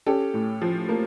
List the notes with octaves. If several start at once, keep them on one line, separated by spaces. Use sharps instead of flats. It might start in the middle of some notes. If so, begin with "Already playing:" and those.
C#4 G4 A4
A2
F3
A#3